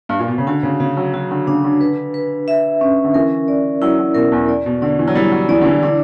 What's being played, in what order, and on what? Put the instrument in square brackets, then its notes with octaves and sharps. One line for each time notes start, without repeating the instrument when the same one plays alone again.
[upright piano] G2
A#2
B2
C#3
[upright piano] D3 [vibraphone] F#4
[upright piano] C#3
[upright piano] C#3 [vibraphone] F#4
[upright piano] F#3
[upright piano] F#3 [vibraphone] F#4
[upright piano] D3
[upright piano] C#3 [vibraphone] D4
[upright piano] D3
[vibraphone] B4
B4
E5
C#4
[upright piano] D3
[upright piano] E3 [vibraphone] A#4
[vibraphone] D5
[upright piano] F#3 [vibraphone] E4
[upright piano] F#3
[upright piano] B2 [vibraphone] A#4
[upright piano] E2
[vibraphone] D5
[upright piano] B2
[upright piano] D3 [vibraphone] D5
[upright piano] E3
F#3
[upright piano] G3 [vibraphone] E4
[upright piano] F#3
[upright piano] E3 [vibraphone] D5
[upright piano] D3
E3
[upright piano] D3 [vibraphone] D4